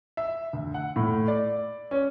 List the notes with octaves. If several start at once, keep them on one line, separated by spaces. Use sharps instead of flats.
E5
D2
F#5
A2
D5
C#4